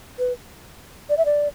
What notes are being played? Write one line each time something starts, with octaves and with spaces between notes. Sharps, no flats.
B4
D5
E5
D5